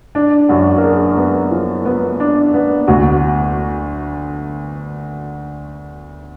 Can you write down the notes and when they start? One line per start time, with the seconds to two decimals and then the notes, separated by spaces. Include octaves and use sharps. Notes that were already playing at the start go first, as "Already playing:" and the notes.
0.15 D4
0.49 F#2 F#4
0.78 A#4
0.83 D4 G#4
1.17 B3
1.51 F3
1.85 B3
2.20 D4
2.54 B3
2.88 D2 F#4